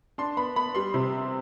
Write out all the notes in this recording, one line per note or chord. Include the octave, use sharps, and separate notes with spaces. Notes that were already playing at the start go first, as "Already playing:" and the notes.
D4 C6
B3 B5
B3 B5
G3 C6
C3